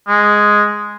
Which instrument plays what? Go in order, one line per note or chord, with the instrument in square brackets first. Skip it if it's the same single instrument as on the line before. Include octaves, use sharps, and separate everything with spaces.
[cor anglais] G#3